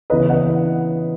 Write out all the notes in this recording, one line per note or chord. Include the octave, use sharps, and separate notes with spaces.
C#3 E3 B3 B4 D#5
D#5 F#5